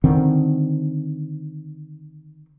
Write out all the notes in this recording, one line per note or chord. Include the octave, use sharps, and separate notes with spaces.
D3 D#3 C4